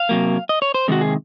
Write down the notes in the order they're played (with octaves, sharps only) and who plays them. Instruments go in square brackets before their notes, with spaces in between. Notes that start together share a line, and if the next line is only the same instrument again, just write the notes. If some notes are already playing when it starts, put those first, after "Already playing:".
Already playing: [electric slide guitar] F5
C3 F#3 A#3
D#5
C#5
C5
C3 D#3 G#3 F#4
G#4